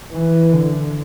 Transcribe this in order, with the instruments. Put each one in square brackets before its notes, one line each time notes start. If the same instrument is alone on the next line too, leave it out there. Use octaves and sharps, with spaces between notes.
[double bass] E3
D3